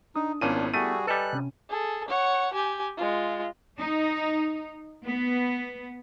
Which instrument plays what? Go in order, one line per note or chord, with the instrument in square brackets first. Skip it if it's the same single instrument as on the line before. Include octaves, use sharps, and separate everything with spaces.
[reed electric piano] D4 D#6 [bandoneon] D#4
[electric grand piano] G#1 C#4 D#7 [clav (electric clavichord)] A#2 [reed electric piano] B3 E4 [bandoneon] D4
[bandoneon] G3 F#4 G#4 [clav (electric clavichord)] A3 [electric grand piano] D#7
[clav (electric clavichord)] G3 A4 [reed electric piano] B4 D#5 G#5 [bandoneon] F#6
[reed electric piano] C3 C#4
[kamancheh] G#4 A4
C#5 F#5
G4 G#5
G#3 F4
[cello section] D#4
B3